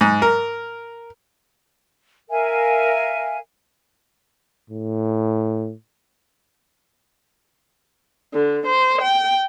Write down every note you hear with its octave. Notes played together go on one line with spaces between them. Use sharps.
G#2
A#4
A#4 E5 F5 G#5
A2
D3
C5
G5